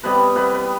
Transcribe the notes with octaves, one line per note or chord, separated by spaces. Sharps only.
C3 G3 B3 B4
B4
C3 G3 B3 B4
B4